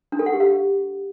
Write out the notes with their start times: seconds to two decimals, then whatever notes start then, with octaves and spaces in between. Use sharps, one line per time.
0.12 D4
0.19 A4
0.26 F#5
0.33 G4
0.40 F5